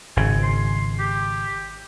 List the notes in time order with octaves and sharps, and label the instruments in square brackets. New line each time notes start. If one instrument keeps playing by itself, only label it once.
[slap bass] G#1 C#3 [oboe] G#5
[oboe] C6
G4